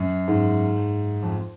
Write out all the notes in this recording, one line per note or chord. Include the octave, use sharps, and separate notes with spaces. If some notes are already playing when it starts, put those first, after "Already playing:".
Already playing: F#2
G#2
F2